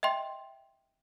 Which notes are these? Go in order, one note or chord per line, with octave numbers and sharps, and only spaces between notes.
D#5 E5 G5 C6